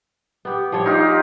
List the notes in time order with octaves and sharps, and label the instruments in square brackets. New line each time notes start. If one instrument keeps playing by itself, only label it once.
[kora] B3 G4
F3 G3 C#5
[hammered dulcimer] D#4 F4 G4